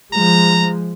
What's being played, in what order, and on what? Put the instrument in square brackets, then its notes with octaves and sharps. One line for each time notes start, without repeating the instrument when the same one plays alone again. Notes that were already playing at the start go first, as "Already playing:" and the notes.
[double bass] F3 G#3 [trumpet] A#5